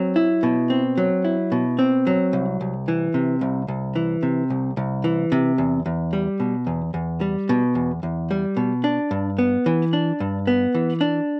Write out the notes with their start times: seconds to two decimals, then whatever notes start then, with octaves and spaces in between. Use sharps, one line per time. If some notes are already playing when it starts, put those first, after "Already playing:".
Already playing: F#3 C4
0.16 E4
0.43 B2
0.70 C4
0.97 F#3
1.25 E4
1.52 B2
1.79 C4
2.07 F#3
2.33 C2
2.61 C2
2.88 E3
3.14 C3
3.41 C2
3.68 C2
3.96 E3
4.23 C3
4.50 C2
4.77 C2
5.04 E3
5.32 C3
5.58 E2
5.86 E2
6.13 G3
6.40 B2
6.67 E2
6.94 E2
7.21 G3
7.49 B2
7.75 E2
8.03 E2
8.31 G3
8.57 B2
8.84 D4
9.11 G2
9.38 B3
9.66 E3
9.93 D4
10.20 G2
10.47 B3
10.74 E3
11.01 D4